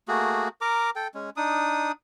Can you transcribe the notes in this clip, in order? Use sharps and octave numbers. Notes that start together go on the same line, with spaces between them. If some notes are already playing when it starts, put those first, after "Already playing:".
A3 A#3 F#4 G#4
A#4 A#5 D6
A4 G5
G#3 C#4
D4 D#4 D#6